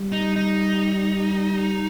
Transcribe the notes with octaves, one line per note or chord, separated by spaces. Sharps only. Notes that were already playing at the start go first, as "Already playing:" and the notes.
Already playing: G3
D#4
D#4